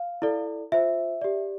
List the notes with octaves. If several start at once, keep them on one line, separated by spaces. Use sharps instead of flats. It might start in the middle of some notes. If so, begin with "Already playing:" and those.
Already playing: F5
E4 A4 D5
F4 C5 E5
G4 D5